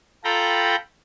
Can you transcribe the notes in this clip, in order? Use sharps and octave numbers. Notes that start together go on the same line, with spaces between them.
F4 A4 G5 A#5 B5